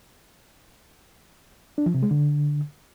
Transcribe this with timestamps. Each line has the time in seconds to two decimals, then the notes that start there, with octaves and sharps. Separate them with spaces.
1.78 D4
1.86 F3
1.94 C3
2.03 G#3
2.11 D3